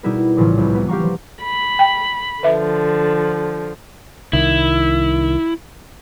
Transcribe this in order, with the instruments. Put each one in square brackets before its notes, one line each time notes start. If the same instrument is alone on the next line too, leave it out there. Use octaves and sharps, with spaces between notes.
[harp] B2 G3 D#4 E4 G#4 A#4
A#1 A2 C#3 E3 F3
C2
A#3 B3
G4 F5 A#5 C#6
F3
[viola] B5
[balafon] G5
[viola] D3 F3 [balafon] B4 E5
[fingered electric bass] C2 D#3 [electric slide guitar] E4